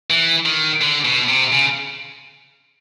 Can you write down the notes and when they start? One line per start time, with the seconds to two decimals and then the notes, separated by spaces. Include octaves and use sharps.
0.10 E3
0.46 D#3
0.81 D3
1.05 B2
1.28 C3
1.52 C#3